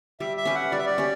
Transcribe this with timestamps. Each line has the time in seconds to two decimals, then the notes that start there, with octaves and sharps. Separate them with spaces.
0.20 G3 E5
0.37 E5
0.45 C#4 G4 B4
0.55 F#5
0.71 G3 D5
0.78 E5
0.86 D5
0.98 C#4 G4